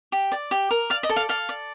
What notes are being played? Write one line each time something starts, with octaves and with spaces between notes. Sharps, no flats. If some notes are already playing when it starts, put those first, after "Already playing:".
G4
D5
G4
A#4
D5 F5
D#5
A4
F5
A4 F5
D5